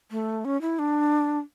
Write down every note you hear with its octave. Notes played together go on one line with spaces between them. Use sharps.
A3
C#4
E4
D4